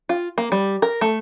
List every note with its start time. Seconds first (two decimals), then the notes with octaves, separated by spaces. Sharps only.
0.09 F4
0.38 A#3
0.52 G3
0.82 A#4
1.01 A3